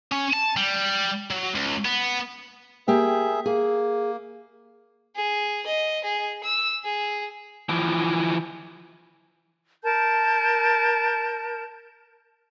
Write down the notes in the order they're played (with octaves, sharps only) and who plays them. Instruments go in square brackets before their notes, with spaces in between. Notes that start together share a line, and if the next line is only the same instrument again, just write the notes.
[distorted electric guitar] C#4
A5
G3
F#3
C#2
B3
[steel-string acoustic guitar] A#3 G4 G5 [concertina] G#4 E5
[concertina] A#3 [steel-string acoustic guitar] G#4
[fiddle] G#4
D#5
G#4
E6
G#4
[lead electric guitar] E3 F3
[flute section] A#4 A5 G6